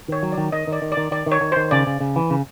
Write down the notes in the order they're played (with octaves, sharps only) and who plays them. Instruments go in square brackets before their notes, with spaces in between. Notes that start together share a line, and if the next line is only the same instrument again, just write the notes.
[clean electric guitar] D#3 [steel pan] C#5
[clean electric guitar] F#3
[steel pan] D5
[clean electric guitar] D#3
[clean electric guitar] D#3 [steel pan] D#5
[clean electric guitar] D#3 [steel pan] D5
[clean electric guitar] D#3
[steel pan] D5
[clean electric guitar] D#3
[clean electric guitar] D#3 [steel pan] D5
[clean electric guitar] D#3
[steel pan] C#5
[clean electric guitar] D#3
[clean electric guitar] D#3 [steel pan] C5
[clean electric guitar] C#3 [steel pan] D5
[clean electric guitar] C#3
C#3
E3
C#3